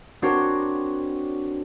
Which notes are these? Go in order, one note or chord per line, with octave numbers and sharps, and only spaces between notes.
C4 D4 F#4 A#4 C5 C#5